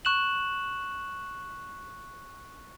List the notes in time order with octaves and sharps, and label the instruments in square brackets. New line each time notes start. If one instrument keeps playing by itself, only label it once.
[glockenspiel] C#6 F#6 E7 F#7